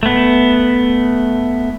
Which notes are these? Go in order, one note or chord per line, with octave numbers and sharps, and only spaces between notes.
A3 B3